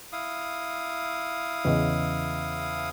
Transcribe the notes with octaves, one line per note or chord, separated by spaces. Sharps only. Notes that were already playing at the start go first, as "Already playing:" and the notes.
E4 F5 D#6
E2 C#3 D#5